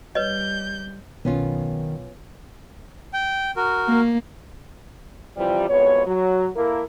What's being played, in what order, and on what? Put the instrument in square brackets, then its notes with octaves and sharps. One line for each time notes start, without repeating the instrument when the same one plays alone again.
[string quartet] G3 G6 [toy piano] B4 C#5 D#5
[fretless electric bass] B1 [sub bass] D#3 [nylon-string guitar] B3 C#4 F4
[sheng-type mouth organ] G5
F#4 A#4
[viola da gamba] A#3
[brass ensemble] C3 E3 F3 G3
C2 F2 G#2 B2 B3 C#5
F#3
A#3 E4 A4 A#4